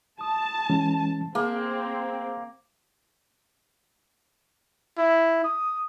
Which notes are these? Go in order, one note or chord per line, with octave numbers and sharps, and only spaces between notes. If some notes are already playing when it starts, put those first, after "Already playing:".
A5 D#6
E3 G#3 C#4
A#3 C4 G#4
E4
D#6